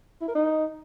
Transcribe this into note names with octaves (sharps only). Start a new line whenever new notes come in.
E4
A#4
D#4